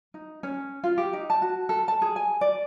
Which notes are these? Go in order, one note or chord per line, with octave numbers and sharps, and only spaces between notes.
D#4
C#4
F4
G4
D#4
A5
F#4
A4
A5
G#4
G#5
D5